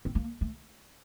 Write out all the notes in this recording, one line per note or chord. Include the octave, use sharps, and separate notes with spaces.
C4
A#3
A3